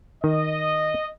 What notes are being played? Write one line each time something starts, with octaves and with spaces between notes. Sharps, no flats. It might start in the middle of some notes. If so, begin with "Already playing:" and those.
D#3 D#5